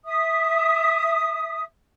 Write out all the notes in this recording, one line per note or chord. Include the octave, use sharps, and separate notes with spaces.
E5 D#6